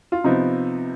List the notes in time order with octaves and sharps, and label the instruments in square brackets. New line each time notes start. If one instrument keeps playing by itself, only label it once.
[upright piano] F4
C3 F3 B3 D#4